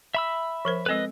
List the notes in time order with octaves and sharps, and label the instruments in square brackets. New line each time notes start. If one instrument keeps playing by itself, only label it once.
[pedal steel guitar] E5 B5 E6
[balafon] F3 A#4 C5
[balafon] G#3 C4 A4 [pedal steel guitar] B4 D#5